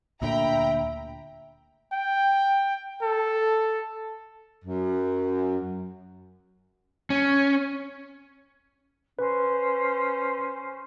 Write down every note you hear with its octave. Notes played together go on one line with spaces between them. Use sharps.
D2 A#2 D3 E5 G5 A#5 B5
G5
A4
F#2
C#4
C#4 B4 C5